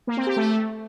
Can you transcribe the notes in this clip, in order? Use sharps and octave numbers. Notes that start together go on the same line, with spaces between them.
A#3
C4
G4
A3